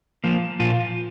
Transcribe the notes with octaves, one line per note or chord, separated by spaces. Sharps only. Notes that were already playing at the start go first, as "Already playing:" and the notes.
F3 A#3
A#2 F3 F4